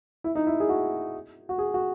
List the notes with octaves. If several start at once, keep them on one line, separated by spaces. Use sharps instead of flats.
E4
D#4
E4
G#4
F#4
F#4
G#4
F#4